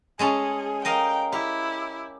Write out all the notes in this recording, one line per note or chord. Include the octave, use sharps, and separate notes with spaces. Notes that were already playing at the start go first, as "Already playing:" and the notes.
G#3 C#4 G#4 A4
A#4 D#5 F5 G5
E4 G4